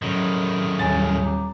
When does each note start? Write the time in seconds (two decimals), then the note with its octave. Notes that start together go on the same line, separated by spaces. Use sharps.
0.02 A2 D#3 F#3 C#4 G#4
0.79 D#1 G#5 A6
1.23 A#5 D6